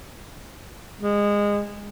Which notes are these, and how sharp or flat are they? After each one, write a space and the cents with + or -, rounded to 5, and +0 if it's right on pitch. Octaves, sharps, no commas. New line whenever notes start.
G#3 -20